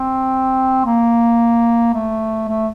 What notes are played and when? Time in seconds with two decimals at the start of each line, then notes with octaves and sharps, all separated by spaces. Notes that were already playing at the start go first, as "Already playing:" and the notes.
Already playing: C4
0.85 A#3
1.94 A3
2.48 A3